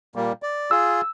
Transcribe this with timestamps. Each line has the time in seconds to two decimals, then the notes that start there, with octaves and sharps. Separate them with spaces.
0.15 A#2 G3 A#3
0.43 D5
0.71 F4 G#4 E6